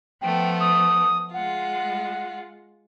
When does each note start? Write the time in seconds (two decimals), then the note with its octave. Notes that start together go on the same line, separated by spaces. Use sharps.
0.21 F3 A3 B3 G5
0.60 D#6
1.33 G#3 F4 F#5